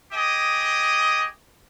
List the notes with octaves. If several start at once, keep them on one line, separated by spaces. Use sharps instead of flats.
G4 G#4 D#5